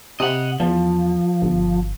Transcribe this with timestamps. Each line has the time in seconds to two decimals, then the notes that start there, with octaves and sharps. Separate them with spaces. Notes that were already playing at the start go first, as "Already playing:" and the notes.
0.20 C3 D#5 F#5
0.60 E2 F3
1.42 G1